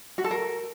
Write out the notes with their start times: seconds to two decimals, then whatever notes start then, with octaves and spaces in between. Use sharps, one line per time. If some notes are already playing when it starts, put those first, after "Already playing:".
0.18 F#4
0.24 A4
0.31 A#4